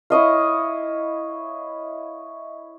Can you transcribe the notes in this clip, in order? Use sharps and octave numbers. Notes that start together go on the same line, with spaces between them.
E4 C#5 D#5 F5